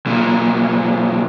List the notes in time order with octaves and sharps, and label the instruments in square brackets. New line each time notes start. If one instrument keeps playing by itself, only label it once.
[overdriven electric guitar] B1 A#2